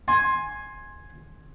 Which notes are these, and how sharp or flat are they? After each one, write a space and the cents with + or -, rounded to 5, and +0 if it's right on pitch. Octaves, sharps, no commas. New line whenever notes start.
G#5 +0 C6 +15